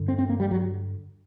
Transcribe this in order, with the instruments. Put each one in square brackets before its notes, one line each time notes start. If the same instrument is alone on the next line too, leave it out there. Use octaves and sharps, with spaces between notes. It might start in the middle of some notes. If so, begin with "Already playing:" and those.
Already playing: [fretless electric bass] G2 D3
C4
C4
A#3
G3
F#3